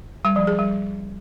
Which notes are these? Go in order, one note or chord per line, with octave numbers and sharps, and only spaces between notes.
G3
F3
G#4
G3